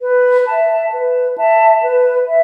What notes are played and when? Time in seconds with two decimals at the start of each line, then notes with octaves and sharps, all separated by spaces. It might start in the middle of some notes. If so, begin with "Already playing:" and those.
0.01 B4
0.46 E5 A5
0.92 B4
1.37 E5 A5
1.81 B4
2.27 E5